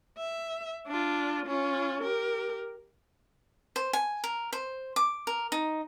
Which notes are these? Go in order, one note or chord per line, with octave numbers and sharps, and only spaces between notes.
E5
D4 F4
C#4 F4
G4 A#4
C5
G#5
A#4
C5
D6
A#4
D#4